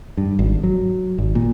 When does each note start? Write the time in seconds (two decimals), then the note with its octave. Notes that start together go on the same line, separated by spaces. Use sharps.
0.17 G2
0.39 G#1
0.63 F#3
1.18 G#1
1.35 A#2